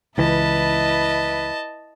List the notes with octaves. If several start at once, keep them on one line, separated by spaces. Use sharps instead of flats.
C#2 E3 E4 B4 D#5 A5